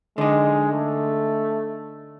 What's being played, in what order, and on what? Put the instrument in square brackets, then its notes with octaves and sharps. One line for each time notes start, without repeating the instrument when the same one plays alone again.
[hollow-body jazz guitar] D3 D#4 [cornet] G#3
[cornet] A3